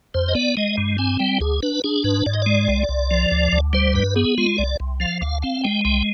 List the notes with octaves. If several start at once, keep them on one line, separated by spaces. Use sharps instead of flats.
F2 C5
D#5
B3 D5
G#3 D#5
G2
C4 G#5
G3 G5
D2 G#4
D4 B4
D4 G#4
G#2 B4
G#2 D5
D#5
G#3 D5
C2
C2
F3
D2
D2
G3 C5
G2 B4
B3 G#4
G#3 F4
C2 D5
C2
F3 F5
D2 F5
C4 F5
G#3 G5
C2 G5